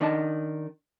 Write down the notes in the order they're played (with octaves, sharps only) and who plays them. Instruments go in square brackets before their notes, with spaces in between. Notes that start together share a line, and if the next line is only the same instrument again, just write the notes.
[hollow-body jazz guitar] D#3 D4 D#5 A5